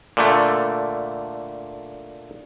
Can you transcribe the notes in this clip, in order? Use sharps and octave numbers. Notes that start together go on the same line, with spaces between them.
A#2 D3 A3